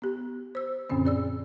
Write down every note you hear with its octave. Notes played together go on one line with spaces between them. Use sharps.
B3 G4
C5 E6
F#2 A#2 D3 C4 C#4
G#4 D5 E6